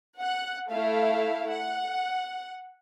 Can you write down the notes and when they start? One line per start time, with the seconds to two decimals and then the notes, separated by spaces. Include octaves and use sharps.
0.18 F#5 F#6
0.70 A3 E4 E5 F5
1.50 F#5